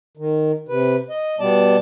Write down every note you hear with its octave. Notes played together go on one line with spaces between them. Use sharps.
D#3
C3 B4
D#5
B2 G3 B3 D5 A5